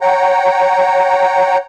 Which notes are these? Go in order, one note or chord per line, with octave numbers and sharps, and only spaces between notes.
C#5 F#5 G5 A#5